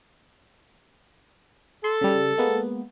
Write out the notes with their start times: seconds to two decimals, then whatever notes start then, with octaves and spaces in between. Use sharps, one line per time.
1.84 A4 C6
2.01 C#3 G3
2.38 G#3 A#3 B3